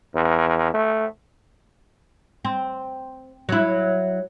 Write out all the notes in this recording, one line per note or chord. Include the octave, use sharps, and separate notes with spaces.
E2
A3
C4
F#3 E4